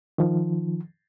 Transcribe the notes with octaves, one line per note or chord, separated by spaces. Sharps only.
D#3 F3